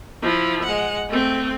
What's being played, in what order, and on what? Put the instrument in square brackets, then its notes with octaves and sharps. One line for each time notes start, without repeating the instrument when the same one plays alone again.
[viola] F3 E4
G#3 F#5
A3 C4